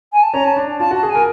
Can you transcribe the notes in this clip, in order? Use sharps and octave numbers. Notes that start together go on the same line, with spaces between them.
G#5
A5
C#4 A#5
A5
D4
F4 A5
F#4 A5
G#4
G#5
A#4